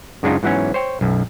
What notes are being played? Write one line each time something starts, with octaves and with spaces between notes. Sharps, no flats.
F#2 C#3 G#3 D4 D#4 F4
G#2 E3 F#3 B3 C#4
C5 C#5 G5
B1 F#2